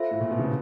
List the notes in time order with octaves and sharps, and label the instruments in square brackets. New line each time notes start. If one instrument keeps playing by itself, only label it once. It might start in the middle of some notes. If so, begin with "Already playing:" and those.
Already playing: [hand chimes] F4 A4 C5 E5
[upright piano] A2
A#2
B2
C#3